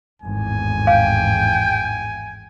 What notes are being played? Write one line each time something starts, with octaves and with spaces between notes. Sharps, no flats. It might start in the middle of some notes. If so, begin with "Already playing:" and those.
G#1 E2 A2 G#5
F5 G5